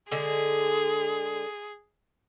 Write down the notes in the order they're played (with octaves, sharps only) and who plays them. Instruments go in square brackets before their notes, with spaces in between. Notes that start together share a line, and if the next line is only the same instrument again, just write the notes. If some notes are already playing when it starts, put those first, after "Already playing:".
[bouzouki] D3 G#3 [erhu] G#4